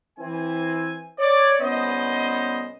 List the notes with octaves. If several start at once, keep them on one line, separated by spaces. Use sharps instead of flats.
E3 C4 G#5
C#5 D5
C2 B3 C#4 B4 C5 D#5